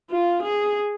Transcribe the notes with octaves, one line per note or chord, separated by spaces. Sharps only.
F4
G#4